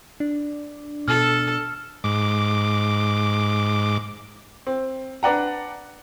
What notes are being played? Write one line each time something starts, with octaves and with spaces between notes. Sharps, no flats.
D4
B2 A4 F6
G#2 D6
C4
D4 B4 D5 F#5 A#5